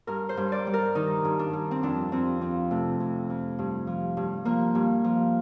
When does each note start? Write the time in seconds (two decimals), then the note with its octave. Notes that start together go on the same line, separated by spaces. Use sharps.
0.07 G2 A#4
0.29 C5
0.37 G2
0.52 D5
0.67 G3
0.74 A#4
0.95 D#3 D#4
1.25 G2
1.39 D4
1.53 G2
1.71 C4
1.83 F2 D4
2.12 F2 C4
2.41 F3 C4
2.71 C3 A3
3.00 F2
3.30 F2
3.59 G2
3.87 F3
4.17 G2
4.45 F3 A#3
4.75 G2
5.04 F3